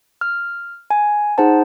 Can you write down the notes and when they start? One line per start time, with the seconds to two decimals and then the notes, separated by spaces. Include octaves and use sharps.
0.21 F6
0.91 G#5
1.38 D#4 G#4 C5 F#5 A5